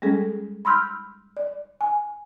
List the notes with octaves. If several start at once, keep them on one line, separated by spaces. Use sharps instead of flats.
G3 G#3 C#4 G#4 A4
B5 C6 E6 F6 G6
D5
G#5